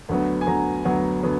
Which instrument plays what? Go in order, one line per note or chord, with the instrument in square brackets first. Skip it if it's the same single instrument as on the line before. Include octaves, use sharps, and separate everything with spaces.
[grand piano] D2 D3 F#3 B3
G#5
D2 D3 F#3 B3 A#5
D2 D3 F#3 B3 F#5
D3 F#3 B3